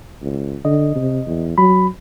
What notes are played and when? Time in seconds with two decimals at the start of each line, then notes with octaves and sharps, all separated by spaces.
0.22 C#2
0.65 D3 D#5
0.96 C3
1.26 E2
1.58 F#3 B5